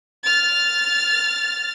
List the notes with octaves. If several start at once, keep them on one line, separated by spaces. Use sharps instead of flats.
F6 A6